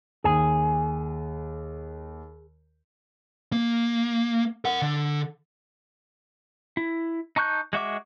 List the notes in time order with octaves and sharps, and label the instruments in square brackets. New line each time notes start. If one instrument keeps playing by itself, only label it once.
[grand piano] D#2 [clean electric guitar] G#4
[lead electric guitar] A#3
A#4 F#5
D3
[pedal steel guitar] E4
D#4 A5 C#6 F#6 G6
G#3 F#4 E5 D6